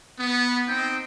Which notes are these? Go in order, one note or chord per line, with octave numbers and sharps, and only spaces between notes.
B3
C4 D#4 G5